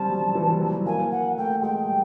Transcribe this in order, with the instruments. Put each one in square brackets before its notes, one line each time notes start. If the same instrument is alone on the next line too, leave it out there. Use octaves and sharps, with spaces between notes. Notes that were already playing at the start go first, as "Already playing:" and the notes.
Already playing: [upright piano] G3 C4 C#4 [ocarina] A5
[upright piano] F#3
E3
G3
F#3
[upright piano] A#3 [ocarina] G#5
[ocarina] F#5
[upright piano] A3 [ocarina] G5
[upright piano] G#3 [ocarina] G5
[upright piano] G3